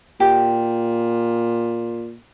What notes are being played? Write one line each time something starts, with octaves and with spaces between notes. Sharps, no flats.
A#2 G4